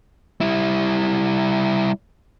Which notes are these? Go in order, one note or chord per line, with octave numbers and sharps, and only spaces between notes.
G3 E4